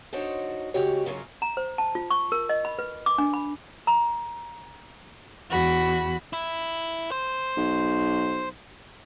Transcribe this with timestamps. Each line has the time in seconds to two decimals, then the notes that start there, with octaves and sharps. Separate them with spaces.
0.13 D4 D#4 F#4 A4 C5 C#5
0.74 C#3 G#3 A3 F#4 G4 C#5
1.05 G#2 C#3 F#3 A#3 F4
1.42 A#5
1.57 C5
1.78 A5
1.95 F4
2.11 C#6
2.32 A#4
2.49 D#5
2.65 B5
2.79 B4
3.06 D6
3.18 D4
3.34 B5
3.87 A#5
5.50 E2 F#4 B5
6.33 E4
7.12 C5
7.57 B1